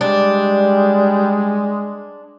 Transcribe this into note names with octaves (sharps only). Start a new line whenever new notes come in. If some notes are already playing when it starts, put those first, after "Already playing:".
G3 G#3 D4